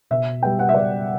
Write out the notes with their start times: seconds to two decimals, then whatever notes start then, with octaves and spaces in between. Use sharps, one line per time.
0.11 B2 E5
0.42 G3 B3 G5
0.59 F#5
0.69 E5
0.74 B2 D5